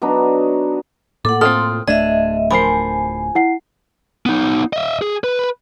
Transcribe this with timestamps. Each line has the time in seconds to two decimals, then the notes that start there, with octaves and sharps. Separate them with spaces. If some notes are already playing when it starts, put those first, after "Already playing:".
0.02 F#3 B3 D4 D#4
1.25 A2 A#3 A4 F#5 D6
1.41 C4 F4 A4 C6 D#6 F6
1.88 D1 A3 D4 D#5 E5 G#6
2.51 F3 A#4 C5 G#5 B5 C7
3.35 E4 F#5 C7
4.26 B3 D#4
4.73 D#5 E5
5.02 G#4
5.24 B4